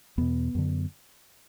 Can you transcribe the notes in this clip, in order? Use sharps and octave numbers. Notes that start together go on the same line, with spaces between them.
E2 B2 B3
F#2 D3